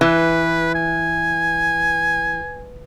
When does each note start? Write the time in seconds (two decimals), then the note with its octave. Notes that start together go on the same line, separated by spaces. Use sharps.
0.01 E3 B4
0.75 G#5